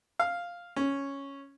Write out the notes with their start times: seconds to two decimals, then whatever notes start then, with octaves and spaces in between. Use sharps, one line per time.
0.20 F5
0.76 C#4